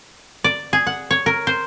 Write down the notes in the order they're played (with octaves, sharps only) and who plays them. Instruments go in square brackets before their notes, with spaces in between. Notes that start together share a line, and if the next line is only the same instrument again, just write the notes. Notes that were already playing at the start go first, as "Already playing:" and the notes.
[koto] D5
G#4
F#5
C#5
A#4
C5